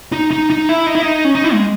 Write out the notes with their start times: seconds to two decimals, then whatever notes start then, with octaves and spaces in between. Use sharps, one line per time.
0.12 D#4
0.31 D#4
0.50 D#4
0.69 E4
0.87 D#4
0.95 E4
1.02 D#4
1.24 C#4
1.35 D#4
1.44 E4
1.53 G#3